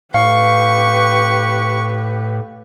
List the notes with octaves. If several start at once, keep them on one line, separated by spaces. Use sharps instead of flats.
A2 G4 B4 F5 C#6